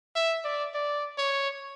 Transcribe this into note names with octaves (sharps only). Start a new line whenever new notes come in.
E5
D5
D5
C#5